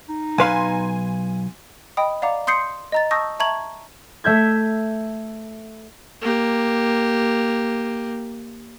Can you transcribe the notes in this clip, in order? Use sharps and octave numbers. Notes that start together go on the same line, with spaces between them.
D#4
B1 B4 F5 G#5 C6
D#5 G5 B5 D#6
D5 F5 F#5 A#5 D6
C6 D#6 G6 C7 C#7
D#5 A#5 A6
A5 C#6 D#6 E6 G6 A#6
E5 A5 A#5 C#6 G#6 F#7
A3 E5 G6 G#6
A#3 G4